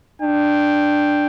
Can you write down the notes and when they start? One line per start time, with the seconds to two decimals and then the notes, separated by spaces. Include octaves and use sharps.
0.22 D4 G5